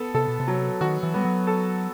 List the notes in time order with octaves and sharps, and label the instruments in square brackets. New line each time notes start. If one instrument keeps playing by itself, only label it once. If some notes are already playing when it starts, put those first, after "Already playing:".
Already playing: [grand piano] B3 A4
[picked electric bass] C3 [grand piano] A4
[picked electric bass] B2
C3
[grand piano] F#3
[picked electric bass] D#3 [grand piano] F#4
[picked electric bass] E3
[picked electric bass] G3 [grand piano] B3
[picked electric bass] F#3
[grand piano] A4